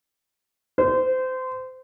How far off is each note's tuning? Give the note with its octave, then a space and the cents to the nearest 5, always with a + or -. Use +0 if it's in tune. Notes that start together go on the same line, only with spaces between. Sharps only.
C5 -25